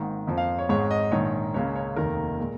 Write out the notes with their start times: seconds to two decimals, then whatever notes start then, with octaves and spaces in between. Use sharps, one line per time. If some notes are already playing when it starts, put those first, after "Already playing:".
Already playing: G#1 G#2 D#3 A#3
0.27 F2 F3 A#3
0.38 F5
0.59 C#5
0.69 G#1 G#2 G#3 C#5
0.91 D#5
1.11 A#1 G#2 D#3 C#5
1.54 C#2 C#3 A#3 C#5
1.75 C#5
1.96 F1 D#2 D#3 A#3 A#4
2.40 A#2 G#3